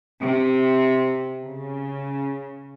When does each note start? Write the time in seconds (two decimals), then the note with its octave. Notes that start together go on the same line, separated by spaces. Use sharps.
0.22 C3
1.42 C#3